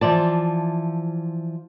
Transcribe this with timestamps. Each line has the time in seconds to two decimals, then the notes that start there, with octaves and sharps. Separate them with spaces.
0.01 E3 F3 D5 A5